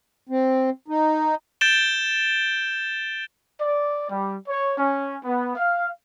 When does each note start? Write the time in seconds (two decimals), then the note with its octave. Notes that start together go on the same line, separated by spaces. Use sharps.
0.29 C4
0.88 D#4
1.61 G6 A6 D7 E7 G7
3.59 D5
4.09 G3
4.48 C#5
4.77 C#4
5.24 B3
5.56 F5